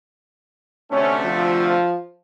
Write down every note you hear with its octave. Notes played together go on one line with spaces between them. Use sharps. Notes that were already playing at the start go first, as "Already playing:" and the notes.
D2 C3 A3 C#4
F3